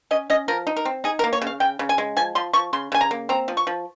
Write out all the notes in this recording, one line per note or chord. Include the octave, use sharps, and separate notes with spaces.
C#4 D#5
C#4 D#5
F3 A#4
D#4
A#4
C4
D#4 G#4
A#4
A#3
C#5
C#3
F5
C#3 G5
C#3
G#5
G#3
F3 G#5
F3 C6
F3 C#6
C#3 C6
C#3 G#5
A#5
A#3
C4 A#5
F3
C#6
F3